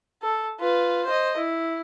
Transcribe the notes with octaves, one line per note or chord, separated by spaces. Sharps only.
A4
F4 B4
C5 D#5
E4